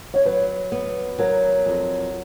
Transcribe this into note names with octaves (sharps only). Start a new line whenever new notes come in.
C#5
F#3 B4
B3
F#3 A#4
F2